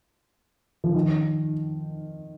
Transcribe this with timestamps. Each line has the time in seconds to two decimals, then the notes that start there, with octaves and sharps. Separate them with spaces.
0.84 F3
0.94 D#3